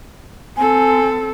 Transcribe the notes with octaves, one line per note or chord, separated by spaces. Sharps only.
C4 A4 G#5